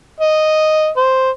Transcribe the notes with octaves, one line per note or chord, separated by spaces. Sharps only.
D#5
C5